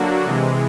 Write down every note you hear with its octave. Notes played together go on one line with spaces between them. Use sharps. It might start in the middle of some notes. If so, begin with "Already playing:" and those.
Already playing: D3 F#3 A#3 D4 F#4
C3 E3 G#3